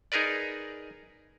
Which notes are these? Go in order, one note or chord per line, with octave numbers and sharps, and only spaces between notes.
D#4 G#4 A#4 B4 D5